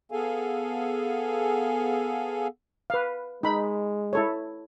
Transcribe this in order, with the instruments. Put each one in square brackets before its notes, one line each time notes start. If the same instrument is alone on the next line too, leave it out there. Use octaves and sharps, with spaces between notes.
[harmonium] B3 G#4 A4 F5 G#5
[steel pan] B4 F5
[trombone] G#3 [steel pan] D#4 B5
[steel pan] E4 A4 C#5